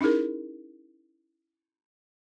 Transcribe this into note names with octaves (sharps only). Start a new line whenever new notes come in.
C#4 D#4 E4 G#4 A#4